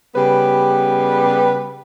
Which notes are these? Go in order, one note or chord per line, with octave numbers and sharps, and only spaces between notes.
C#3 G3 B3 G4 B4